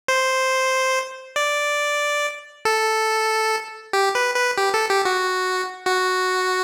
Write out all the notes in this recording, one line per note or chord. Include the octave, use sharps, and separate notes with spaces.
C5
D5
A4
G4
B4
B4
G4
A4
G4
F#4
F#4